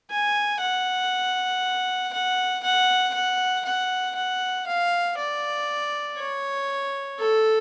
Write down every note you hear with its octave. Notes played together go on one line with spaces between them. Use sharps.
G#5
F#5
F#5
F#5
F#5
F#5
F#5
F5
D5
C#5
A4